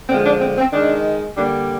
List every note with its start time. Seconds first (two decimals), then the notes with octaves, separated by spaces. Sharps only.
0.09 D3 F3 G#3 C4
0.26 D4
0.41 C4
0.58 C4
0.73 D#3 G#3 D4
1.36 D3 G3 A#3 D4